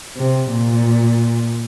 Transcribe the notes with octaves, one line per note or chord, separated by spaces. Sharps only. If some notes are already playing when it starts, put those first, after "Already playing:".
C3
A#2